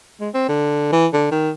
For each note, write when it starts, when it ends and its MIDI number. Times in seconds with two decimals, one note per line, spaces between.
0.21 0.29 56
0.34 0.45 60
0.49 0.88 50
0.92 1.07 52
1.13 1.28 50
1.32 1.51 51